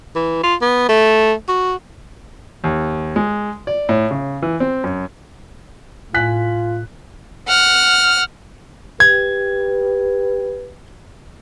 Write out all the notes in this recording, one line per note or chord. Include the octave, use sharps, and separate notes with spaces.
E3
F4
B3
A3
F#4
D#2
G#3
D5
A2
C#3
E3
C4
F#2
A2 F4 G#5 F#6 B6
F#5 F6
G4 B4 G#6